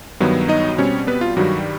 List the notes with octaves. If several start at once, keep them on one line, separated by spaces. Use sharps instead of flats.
G2 D#3 F#3 B3
D#4 D#5
B2 G3 C4 C#4 C#5
B3 B4
F4
G2 D#3 F#3 G3 F#4